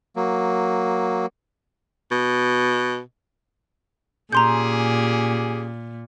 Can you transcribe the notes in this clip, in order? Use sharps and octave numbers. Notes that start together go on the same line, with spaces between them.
F#3 A#3
B2
A#2 C#4 G4 G#4 A#5 C6 G6